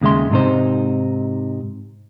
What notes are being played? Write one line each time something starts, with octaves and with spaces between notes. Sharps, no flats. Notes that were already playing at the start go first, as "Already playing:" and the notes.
D#2 C#3 G#3 E5 C6
G#2 C3 D#4 C5